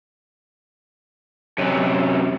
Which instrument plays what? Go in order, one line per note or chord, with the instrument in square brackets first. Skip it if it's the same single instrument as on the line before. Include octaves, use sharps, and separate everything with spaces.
[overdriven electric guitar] F#2 C3